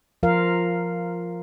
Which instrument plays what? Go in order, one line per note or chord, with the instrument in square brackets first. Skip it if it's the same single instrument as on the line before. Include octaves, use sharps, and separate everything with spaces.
[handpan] F3 F4 A#4 F5